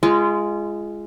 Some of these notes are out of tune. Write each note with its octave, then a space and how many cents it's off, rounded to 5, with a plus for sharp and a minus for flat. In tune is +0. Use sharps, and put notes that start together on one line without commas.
G#3 +0 F4 -30